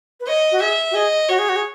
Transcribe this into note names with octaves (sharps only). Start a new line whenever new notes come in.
B4
C#5 D#5
F#4
G#4 E5
F#4
G#4 D#5
F#4 C#5
G#4
F#4
G#4